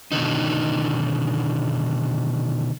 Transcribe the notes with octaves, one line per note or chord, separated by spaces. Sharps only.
B2 D3 D#3 D#4